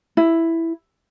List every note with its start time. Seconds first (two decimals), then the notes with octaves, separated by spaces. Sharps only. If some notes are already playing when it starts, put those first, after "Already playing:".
0.17 E4